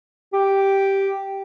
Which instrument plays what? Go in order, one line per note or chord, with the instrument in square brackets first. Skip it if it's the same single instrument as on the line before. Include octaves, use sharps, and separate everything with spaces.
[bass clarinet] G4